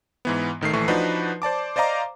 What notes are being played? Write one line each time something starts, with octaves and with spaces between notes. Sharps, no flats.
G#2 E3 B3
A1 D#3 A3 C7
A#1 E3 A3 C#6
F3 D4 D#4 F#4 B4
C5 D5 A5 D6
C5 D5 D#5 F5 A#5 D6